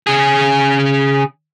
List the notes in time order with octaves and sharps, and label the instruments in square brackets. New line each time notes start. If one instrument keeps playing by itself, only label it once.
[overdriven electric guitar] C#3 G#4